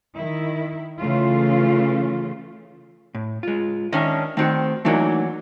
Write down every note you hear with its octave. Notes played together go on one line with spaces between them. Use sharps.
D#3 E4
C#3 E3 A3 C#4 F4
A2
G#3 F4
D#3 C#4 D4 D#5 E5
D#3 A3 C4 F#4
E3 F#3 A3 A#3 D4 D#4